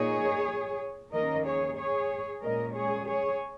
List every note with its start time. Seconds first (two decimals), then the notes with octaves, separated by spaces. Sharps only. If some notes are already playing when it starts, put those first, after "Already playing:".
Already playing: A#2 A#3 D#4 G#4 C#5
1.12 D#2 D#3 A#3 C#4 A#4 D#5
1.45 G#4 C#5
1.77 G#4 C#5
2.42 A#2 G#3 C#4 A#4 D#5
2.74 G#4 C#5
3.07 G#4 C#5